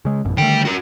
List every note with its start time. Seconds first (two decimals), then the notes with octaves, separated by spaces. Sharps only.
0.05 C#3 G#3
0.25 A1 F#2 B2
0.38 D3 D#3 G3 A3 G5
0.65 F#4 A#4